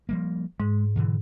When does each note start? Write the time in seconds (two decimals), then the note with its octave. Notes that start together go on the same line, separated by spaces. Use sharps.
0.09 F3 G3 A#3
0.60 G#2 G#3
0.96 B2 D3 E3